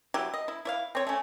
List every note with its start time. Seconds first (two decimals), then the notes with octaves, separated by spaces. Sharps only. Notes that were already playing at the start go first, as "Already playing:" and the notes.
0.14 F#3 E4 G4
0.34 D#5
0.48 E4
0.65 E4 C#5 F5
0.95 C4 C#5
1.07 A3 C#4